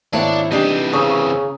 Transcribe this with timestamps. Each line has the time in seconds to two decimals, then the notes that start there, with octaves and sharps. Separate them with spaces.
0.13 G#1 A#3 D4 E4 C#5 F#5
0.52 C3 E3 G3 D4 D#4 G4 C7
0.93 C#3 C4 A#5 C#6 D#6